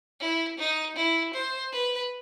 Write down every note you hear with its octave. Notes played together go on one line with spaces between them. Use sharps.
E4
D#4
E4
C5
B4